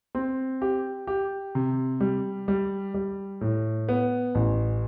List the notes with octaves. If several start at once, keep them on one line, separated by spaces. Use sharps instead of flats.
C4
G4
G4
C3
G3
G3
G3
A2
B3
A1